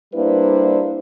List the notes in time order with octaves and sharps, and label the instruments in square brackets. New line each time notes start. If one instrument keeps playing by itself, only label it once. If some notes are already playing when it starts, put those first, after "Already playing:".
[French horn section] G3 A#3 D4 E4 B4 C5